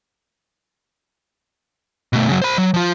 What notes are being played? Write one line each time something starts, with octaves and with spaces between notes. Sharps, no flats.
B2 A3
C#3 F#3
C5 B5
F#3
F3 F4